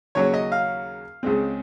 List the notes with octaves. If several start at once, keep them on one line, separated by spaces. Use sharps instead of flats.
D#2 C#3 F#3 C#4 C#5
D#5
F5
C#2 C#3 G#3 C4